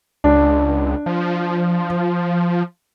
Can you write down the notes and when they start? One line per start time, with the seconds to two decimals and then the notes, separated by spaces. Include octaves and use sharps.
0.24 C#2 D4
1.06 F3